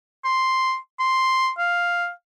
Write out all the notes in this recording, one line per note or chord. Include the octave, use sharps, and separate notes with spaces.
C6
C6
F5